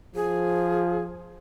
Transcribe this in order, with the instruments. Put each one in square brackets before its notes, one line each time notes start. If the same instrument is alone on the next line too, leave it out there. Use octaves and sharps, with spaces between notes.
[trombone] F3 [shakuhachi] G#4